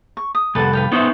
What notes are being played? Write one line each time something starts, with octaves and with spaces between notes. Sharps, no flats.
C#6
D#6
C2 F2 A4 B4 F#5
B4 F5 G5
B3 D#4 E4 C5 C#5